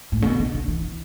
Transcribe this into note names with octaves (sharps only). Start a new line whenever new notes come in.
A2
C#3
B2
D3
D3
E3